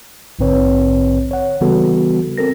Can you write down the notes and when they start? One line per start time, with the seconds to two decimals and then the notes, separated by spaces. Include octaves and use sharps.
0.39 A#1 G#2 D3 C4 B4 C#5
1.31 C#5 F#5
1.61 C#3 E3 G3 B3 F#4 A4
2.37 C4 A4 A#4 A#6